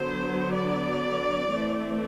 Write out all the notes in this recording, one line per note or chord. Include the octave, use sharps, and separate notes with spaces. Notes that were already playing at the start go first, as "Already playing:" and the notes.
Already playing: D3 F#3 B3 C5
D5
E3 A3 C4